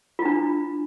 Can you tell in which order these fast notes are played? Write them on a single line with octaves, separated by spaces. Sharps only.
F4 E4 D4